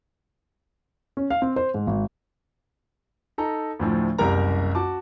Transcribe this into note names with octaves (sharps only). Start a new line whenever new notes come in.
C#4
F5
C4
C5
G#2
G#1
D#4 A4 A#5
D2 A2 F3
F#1 C2 G4 A#4 A#5
F#4 A5 D6